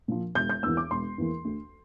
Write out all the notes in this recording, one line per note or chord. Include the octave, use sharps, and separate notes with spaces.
A#2 F3
E1 G6
G6
E2 E3 A#3 E6
D6
E1 C6
E2 E3 A#3
D2